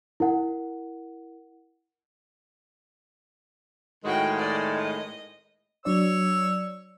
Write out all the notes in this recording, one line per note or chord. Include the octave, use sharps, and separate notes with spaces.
E4 A#4 F#5
A2 D#3 G#3 F#4 G5
D5 D#5
D#5
F#3 D4 C#5 D5 E6